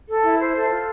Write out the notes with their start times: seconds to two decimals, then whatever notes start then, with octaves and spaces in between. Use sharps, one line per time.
0.08 A4
0.23 E4
0.39 C5
0.54 A4
0.70 F4